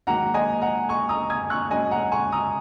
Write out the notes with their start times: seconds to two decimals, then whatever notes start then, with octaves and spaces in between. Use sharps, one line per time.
0.07 G#2 D#3 F#3 A#3 F#5 A#5
0.34 D#5 G#5
0.61 F#5 A#5
0.89 G#5 C#6
1.09 A#5 D#6
1.30 D#6 G#6
1.50 C#6 F#6
1.71 G#2 F#3 C#4 D#5 G#5
1.91 F#5 A#5
2.12 G#5 C#6
2.32 A#5 D#6